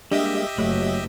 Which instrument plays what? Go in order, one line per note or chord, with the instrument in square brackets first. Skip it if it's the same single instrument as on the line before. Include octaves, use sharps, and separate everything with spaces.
[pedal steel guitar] G3 G#3 A#3 [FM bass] D4 [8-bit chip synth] G4 D#5 E5
[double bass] F#1 [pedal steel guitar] F#3 [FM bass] A3